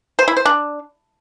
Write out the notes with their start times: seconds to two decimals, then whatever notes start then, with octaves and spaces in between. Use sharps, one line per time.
0.19 C5
0.28 E4
0.37 C5
0.45 D4